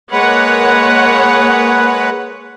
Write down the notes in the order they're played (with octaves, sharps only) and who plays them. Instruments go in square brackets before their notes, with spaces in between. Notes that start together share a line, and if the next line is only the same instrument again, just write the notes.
[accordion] G#3 B4 [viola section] A#3 C#5 F#5